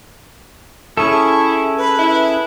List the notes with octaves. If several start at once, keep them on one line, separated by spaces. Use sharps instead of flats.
C#4 E4 G#4 A4 C#6
B4
E4